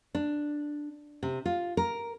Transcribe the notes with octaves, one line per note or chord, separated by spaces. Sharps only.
D4
C3
F4
A#4